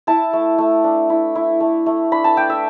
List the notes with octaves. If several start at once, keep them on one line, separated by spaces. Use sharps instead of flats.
E4 A5
A3
A3
D4
E4
E4
A3
A3
D4 B5
A5
D4 G5
E5